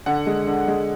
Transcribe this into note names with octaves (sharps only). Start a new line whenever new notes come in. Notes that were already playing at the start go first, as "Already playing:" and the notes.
D3 F#5
G#3
D3
G#3